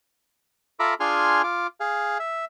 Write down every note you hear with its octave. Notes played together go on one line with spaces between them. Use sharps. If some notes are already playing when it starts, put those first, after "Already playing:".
F4 A4 E5 A#5 B5 D6
D4 F4 G#4 G#5 C6 F6
F4 D6
G#4 F5
E5